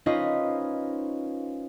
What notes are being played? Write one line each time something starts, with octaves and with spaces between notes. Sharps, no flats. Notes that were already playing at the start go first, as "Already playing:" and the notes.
C#4 D#4 F4 B4 C5 D#5